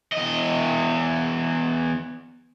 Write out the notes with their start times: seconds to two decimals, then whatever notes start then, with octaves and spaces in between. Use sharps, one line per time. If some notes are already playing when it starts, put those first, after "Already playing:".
0.13 E2 D#5